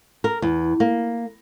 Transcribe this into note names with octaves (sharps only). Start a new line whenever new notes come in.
A#4
E2
A#3